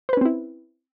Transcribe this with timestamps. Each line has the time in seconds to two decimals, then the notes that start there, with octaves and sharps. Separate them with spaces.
0.09 C5
0.13 B4
0.17 C#4
0.21 C4
0.25 E4